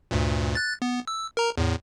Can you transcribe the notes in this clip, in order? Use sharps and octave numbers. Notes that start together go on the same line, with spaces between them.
D2 G2 A#2
F#6 A6
B3
E6
A#4 A#5
E2 A2